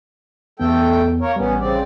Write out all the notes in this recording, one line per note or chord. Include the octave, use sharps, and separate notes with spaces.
E2 A3 B3 A4 G5
A#3 A#4 C#5
A1 G3 B3 C#4
C#3 C4 D5